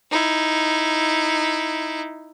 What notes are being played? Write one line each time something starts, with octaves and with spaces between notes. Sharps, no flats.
D#4 E4